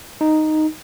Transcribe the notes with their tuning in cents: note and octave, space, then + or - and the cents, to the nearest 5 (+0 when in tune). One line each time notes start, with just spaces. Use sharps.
D#4 -5